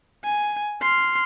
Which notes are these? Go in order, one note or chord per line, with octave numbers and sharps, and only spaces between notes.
G#5
C6 F6